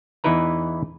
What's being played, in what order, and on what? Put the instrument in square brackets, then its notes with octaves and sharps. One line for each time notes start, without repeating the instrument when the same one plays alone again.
[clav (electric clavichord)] E2 E3 D#4 E4 B4 A#5